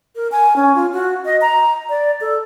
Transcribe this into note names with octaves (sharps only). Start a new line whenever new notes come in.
A#4
G#5
C#4
F4
F#4
D#5
A#5
D5
A4